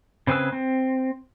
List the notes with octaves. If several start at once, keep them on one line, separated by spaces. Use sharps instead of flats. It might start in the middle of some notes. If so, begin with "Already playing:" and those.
C#3 C4 G#4 B4 E6
C4